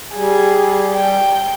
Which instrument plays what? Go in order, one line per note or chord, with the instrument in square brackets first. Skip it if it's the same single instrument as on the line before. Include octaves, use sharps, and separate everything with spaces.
[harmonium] G3 [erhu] G#4
[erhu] G5